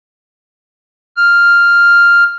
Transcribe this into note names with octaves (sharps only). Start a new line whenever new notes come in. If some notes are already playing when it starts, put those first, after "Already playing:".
F6